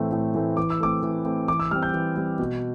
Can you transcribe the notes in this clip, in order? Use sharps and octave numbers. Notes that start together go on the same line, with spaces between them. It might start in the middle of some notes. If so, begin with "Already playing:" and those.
Already playing: A2 E3 A3 C4
A2
E3 A3 C4
E3 D6
E6
A3 C4 D6
E3
A3 C4
E3 D6
E6
G3 C4 F6
G6
E3
G3 C4
B2